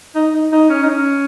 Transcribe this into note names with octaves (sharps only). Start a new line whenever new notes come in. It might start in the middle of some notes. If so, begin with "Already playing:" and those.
D#4
D#4
D#4
C#4
D#4
C#4